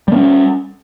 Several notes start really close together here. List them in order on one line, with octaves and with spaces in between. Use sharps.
G3 A#3 C#4